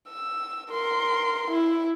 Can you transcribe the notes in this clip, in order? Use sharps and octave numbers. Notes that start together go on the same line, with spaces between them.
E6
A#4 C6
E4